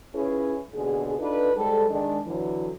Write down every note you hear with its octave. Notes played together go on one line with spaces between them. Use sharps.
C#4 E4 F4 G#4 B4 C#5
D#2 B2 D3 G#4
D4 D#4 F4 A4 B4
G#2 G3 A4
D#3 G#3 D4
D3 E3 F#3